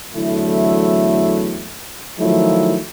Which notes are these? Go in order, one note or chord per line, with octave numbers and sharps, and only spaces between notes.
E2 D3 F#3 A3 E4
D#3 F3 F#3 A3 E4 F4